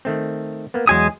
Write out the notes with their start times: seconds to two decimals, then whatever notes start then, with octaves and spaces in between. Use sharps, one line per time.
0.05 D#3 A3 C4
0.74 A#3 B3
0.87 E2 F#3 G#3 G5 G#5 D#6